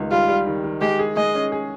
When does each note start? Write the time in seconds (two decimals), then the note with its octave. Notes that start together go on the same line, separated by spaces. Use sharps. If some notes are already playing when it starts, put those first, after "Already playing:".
Already playing: C#2 D#3 G3
0.11 G3 F4
0.29 G3
0.46 D#3
0.64 D#3
0.81 G#3 G4
0.99 G#4
1.17 G#3 D#5
1.35 C#4
1.52 G#4